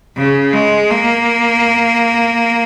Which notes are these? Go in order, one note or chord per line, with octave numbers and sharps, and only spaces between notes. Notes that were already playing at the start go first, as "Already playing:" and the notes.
C#3
G#3
A#3